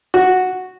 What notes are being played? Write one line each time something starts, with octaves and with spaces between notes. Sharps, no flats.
F#4